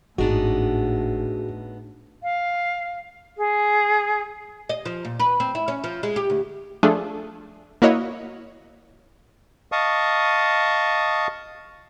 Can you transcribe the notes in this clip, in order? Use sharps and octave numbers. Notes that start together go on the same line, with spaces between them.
G#1 A2 B3 D4 D#4 F#4 G#4
F5
G#4
D#5
F3
A#2
B4
C4
E4
C#4
F3
G#3
G4
D2
F3 A3 D4 F4 G#4 A4
A#3 E4 F#4 C#5 D#5
D#5 F5 A5 C#6 D#6